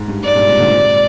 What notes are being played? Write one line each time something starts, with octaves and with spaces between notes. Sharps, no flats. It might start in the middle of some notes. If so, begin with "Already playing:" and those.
Already playing: G#2
G2
G#2 D5
G2 A#2
G#2 C3
A#2 D3
G#2 C3